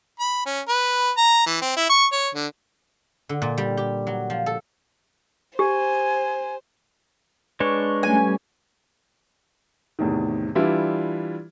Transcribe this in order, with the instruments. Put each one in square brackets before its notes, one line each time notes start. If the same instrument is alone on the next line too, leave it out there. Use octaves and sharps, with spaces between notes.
[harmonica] B5
C#4
B4
A#5
E3
C4
E4
C#6
C#5
D3
[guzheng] D3
A#2
G3
G4
F#3
F3
A4
[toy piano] G4 [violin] C5 [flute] G#5
[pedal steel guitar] G#3 D4 C#5 [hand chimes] B4 C#6
[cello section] G3 A3 C#4 [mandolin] G#5
[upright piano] E2 A2 C3 D#3
E3 G3 D4 E4 F4